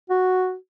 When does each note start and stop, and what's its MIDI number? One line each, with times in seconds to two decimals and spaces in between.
0.10 0.55 66